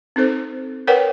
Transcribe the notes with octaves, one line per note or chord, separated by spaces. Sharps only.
C4 D#4 A4 C5
A#4 B4 C#5 F#5 G5